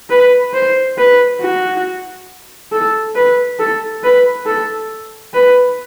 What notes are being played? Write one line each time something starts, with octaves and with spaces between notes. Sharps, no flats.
B4
C5
B4
F#4
A4
B4
A4
B4
A4
B4